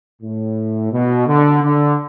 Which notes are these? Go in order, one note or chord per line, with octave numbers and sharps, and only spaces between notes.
A2
B2
D3
D3